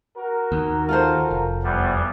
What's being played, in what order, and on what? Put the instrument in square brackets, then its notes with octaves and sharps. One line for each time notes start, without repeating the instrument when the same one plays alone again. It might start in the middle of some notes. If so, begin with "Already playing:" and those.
[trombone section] F#4 A#4
[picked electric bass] D#2
[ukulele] F4 A4 C5
[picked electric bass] F1
[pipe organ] E2 G3 [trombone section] F3 B3